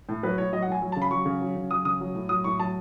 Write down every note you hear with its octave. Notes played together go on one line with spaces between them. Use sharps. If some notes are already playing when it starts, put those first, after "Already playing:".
A2
F#3 B4
A2 C#5
F#3 D#5
F#5
A2
G#5
F#3
A5
C#3
B5
F#3 C#6
C#3
F#3
C#3
F#3 D#6
C#3 D#6
F#3
A2
F#3 D#6
A2 C#6
F#3 A5